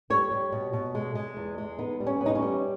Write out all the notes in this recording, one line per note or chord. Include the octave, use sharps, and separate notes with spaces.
G3 C#5
G3
B2
B2
G#3
G#3
E2
G#3
B3 D#4
G3
C#4
B3
D#4
C#4
G3